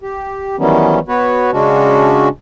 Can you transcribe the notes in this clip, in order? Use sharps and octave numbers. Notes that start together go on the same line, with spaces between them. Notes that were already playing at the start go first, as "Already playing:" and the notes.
G4
D#3 E3 F#3 G3 B3 C#4
B3 F#4 B4 C#5
C#3 G#3 C#4 D4 F#4